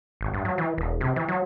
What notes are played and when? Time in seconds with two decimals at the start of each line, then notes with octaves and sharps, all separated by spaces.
0.21 G#1
0.34 G2
0.45 F#3
0.58 E3
0.78 E1
1.01 C3
1.16 E3
1.28 F#3